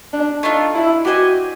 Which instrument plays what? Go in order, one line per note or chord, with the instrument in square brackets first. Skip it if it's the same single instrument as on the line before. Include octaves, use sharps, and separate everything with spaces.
[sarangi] D4
[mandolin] A3 D4 F4 [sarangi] D#4
[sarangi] E4
[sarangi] F#4 [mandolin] G4 C5 D#5 G#5